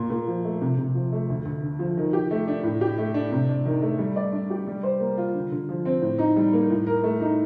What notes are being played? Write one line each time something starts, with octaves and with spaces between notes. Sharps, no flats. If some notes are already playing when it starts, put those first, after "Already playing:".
Already playing: A#2
A#2
F3
A3
C3
C3
F3
A3
D2
D2
D3
F3
D#3
G4
A3
D4
A2
G4
A3
D4
C3
D4
D#3
A3
G3
D5
D4
G4
G3
C5
A#3
F4
D3
D3
F3
C4
A2
D#4
G3
A#3
A2
A#4
A3
D#4